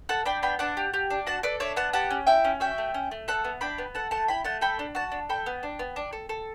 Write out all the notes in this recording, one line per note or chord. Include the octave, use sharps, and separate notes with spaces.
A4 F#5 A5
D4 G5 B5
B3 G5 B5
D4 F#5 A5
G4
G4
D4
F#4 F#5 A5
A4 B4 D5
D4 C#5 E5
B3 F#5 A5
G4 F#5 A5
C#4
E4 E5 G5
C#4
F#4 E5 G5
A3
C#4
A3
A4 F#5 A5
B3
D4 G5 B5
B3
A4 F#5 A5
A3 F#5 A5
E4 G5 B5
A3 F#5 A5
A4 G5 B5
D4
F#4 F#5 A5
D4
A4 G5 B5
B3
D4
B3
D4
A4
A4